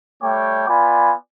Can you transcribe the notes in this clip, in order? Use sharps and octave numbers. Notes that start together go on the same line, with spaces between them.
G3 A3 C#5 G5 D6
B3 F4 D5 G#5 B5